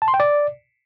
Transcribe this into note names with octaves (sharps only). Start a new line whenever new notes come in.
A5
C6
G5
D5